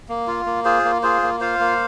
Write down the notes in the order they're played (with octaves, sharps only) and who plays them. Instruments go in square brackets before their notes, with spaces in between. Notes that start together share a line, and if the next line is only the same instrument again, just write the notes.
[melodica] A#3
F4
A#3
F4 G#4 C5
A#3
F4 G#4 C5
A#3
F4 C5 F5
A#3